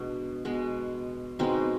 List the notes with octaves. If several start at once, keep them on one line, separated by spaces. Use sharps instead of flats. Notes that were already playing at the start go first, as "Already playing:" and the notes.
Already playing: B2 G#3 D4
B2 G#3 B3
B2 G#3 B3 C4 D#4